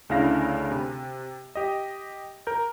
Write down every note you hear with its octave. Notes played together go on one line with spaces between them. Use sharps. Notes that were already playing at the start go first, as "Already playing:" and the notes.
D2 C#3 D4 E4 F5 A#6
C3
G4 D#5
A#4 G6